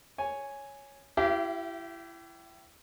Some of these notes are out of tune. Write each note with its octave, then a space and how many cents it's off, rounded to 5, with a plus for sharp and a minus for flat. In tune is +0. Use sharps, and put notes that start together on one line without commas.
C#5 +0 G#5 +0
E4 +25 G4 -25 F5 -45